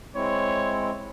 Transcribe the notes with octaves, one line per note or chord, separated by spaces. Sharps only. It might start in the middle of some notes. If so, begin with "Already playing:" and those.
G#3 C4 E4 C#5